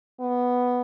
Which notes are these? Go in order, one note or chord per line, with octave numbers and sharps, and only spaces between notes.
B3